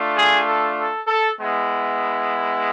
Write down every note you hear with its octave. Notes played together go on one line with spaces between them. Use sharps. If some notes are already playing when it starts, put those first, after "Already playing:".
Already playing: A3 D4 F4
G#4
A4
A4
A4
G#3 B3 E4